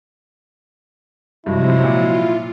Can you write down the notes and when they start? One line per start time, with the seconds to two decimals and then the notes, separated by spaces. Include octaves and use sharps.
1.46 G2 C3 F3 F#3 G#3 E4 F#4
1.84 A#2 F4